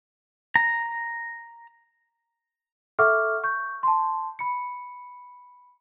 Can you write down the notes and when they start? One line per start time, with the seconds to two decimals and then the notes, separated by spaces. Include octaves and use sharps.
0.56 A#5
2.99 A4 E5 F#5 C#6 D6 F6
3.44 C#6 G6
3.83 A5 C6
4.39 B5 C#7